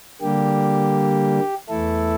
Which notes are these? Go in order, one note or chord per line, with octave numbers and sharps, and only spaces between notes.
D3 G3 A#3 G4
E2 E3 A3 E4 A4